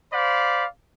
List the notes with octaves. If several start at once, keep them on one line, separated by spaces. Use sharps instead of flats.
C5 D5 F5 B5